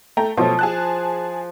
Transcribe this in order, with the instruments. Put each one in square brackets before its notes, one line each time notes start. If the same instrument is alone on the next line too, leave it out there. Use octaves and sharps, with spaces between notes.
[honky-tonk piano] A3 G5 A#5
[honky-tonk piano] B2 F#3 A3 [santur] F3
[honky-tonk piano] G#4 A5 F#6